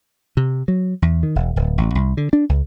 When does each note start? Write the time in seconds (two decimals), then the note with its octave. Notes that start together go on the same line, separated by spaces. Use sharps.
0.37 C3
0.68 F#3
1.02 E2
1.23 D#3
1.36 E1
1.56 D1
1.78 A1
1.95 C2
2.17 D3
2.33 D4
2.49 C#2